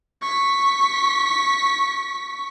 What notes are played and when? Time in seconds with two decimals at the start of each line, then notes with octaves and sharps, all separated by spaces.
0.22 C#6 B6